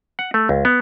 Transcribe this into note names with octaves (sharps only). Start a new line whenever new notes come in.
F#5
A3
C#2
B3